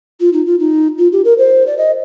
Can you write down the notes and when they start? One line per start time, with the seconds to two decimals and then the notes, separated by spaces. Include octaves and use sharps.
0.20 F4
0.32 D#4
0.46 F4
0.59 D#4
0.98 F4
1.12 G4
1.24 A#4
1.38 C5
1.66 D5
1.77 D#5